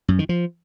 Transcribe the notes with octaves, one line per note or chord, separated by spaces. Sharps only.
F#2
D#3
F3